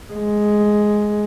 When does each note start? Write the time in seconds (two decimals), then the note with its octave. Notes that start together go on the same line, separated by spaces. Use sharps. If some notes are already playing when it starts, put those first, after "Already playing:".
0.13 G#3